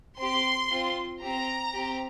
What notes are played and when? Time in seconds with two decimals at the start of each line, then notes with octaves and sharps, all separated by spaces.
0.19 C4 G4 C6
0.70 C4 F4
1.21 C4 G4 A#5
1.73 C4 G4